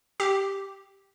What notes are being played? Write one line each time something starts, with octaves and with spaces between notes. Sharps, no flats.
G4